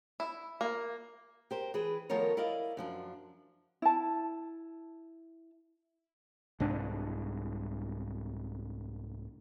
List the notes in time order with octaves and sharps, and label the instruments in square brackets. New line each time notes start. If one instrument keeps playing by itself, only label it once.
[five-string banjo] E4
A#3
[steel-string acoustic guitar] G4 A#4 C5
E3 G#4 B4
D#3 F3 A3 B3 A#4 C#5
E4 A#4 D5 D#5 F5
F#2 F3 D4
[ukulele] E4 A5
[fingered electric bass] C2 G#2 D4